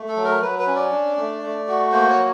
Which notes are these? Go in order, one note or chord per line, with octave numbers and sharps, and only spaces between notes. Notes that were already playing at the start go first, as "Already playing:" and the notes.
Already playing: A3
A4
F#3
A#4
F#3 B4
B4
C#4
D5
D4
A3
A3
F#4
A#3 C5
C#5
F#3